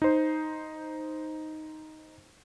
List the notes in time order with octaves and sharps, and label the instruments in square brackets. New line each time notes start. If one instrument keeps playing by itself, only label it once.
[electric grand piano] D#4 C5